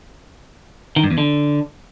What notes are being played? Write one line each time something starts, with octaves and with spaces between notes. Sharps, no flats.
D#3
G2
E2
D3